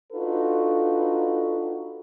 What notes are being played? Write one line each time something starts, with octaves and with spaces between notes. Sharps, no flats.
D4 D#4 F4 F#4 A4 B4